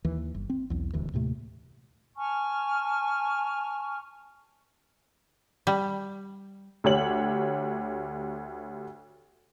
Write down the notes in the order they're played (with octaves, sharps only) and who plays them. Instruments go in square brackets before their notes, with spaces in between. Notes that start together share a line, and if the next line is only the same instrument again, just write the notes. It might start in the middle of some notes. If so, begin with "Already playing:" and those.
[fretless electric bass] D#2 E3
G1
C4
B1 E2
D#1 D2 E3
D#2 A2 C3 A3
[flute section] G#5 A5 C#6 F6
[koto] G3
[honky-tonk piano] D2 G4 C#5 F#7